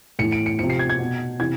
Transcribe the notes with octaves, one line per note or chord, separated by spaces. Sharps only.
A2 E3 C#7
D7
C#7
C3 F3 C#7
C7
G#6
G#6
B2
C3 E3 G#6